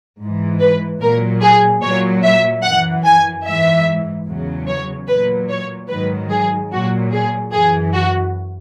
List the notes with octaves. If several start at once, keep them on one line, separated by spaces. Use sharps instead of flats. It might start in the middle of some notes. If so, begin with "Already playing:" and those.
G#2 E3
B4
A#2 F#3 A#4
G#4
A#2 F#3 C#5
E5
F#2 E3 F#5
G#5
G#2 E3 E5
E2 C#3 F#3
C#5
A#2 F#3 B4
C#5
G#2 D#3 F#3 B4
G#4
A#2 F#3 F#4
G#4
F#2 E3 G#4
F#4